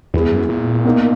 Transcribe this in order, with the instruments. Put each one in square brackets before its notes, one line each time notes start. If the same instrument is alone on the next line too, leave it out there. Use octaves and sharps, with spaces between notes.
[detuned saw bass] E2 [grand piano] G#3 B3 E4 G#4
[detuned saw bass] F#2
A#2
[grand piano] B2 A#3 D#4